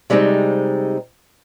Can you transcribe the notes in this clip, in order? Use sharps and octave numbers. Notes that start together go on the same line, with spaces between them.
C3 G3 G#3 C4 D#4